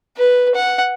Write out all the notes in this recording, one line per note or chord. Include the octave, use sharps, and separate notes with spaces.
B4
F#5